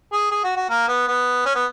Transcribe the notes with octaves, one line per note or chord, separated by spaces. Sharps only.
G#4
G#4
F#4
F#4
A#3
B3
B3
C#4
B3